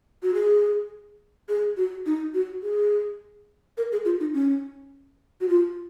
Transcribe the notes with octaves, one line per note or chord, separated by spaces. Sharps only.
F#4
G#4
G#4
F#4
D#4
F#4
G#4
A#4
G#4
F4
D#4
C#4
F#4
F4